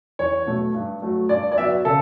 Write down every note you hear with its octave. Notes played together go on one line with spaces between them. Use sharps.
E2 C#5
B2 F#3 A3
G2
F#3 A3
G2 D5
D5
F#3 B3 E5
C#3 A4